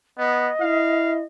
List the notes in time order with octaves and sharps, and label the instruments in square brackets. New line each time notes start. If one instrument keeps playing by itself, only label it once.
[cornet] B3 [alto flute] D#5
[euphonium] E4 [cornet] F5